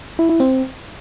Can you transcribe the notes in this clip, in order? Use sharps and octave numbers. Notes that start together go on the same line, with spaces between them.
E4
E4
C4